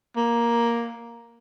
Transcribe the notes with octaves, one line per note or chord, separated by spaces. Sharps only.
A#3